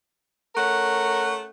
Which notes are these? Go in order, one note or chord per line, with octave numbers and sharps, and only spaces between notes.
A3 C#4 A#4 F#5